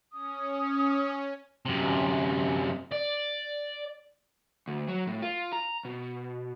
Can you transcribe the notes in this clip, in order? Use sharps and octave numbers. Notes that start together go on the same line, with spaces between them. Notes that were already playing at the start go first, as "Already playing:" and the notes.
C#4 D#6
F#2 C3
D5
D2
F#3
A2
F4
A#5
B2